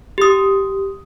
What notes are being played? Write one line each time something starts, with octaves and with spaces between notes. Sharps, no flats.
G4 D#6